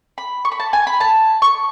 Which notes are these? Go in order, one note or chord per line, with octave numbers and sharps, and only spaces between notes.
B5
C#6
B5
A5
G#5
B5
A5
C#6